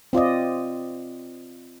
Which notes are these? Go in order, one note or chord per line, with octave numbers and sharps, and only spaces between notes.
C4 F4 D5 D#5